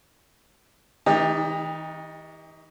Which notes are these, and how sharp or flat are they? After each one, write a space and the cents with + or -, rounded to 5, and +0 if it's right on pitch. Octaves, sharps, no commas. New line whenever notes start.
E3 -45 D#4 +0 G4 +25